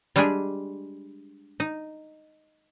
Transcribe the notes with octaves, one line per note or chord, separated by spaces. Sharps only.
G3 G#3 D4 G4 G#4
D#4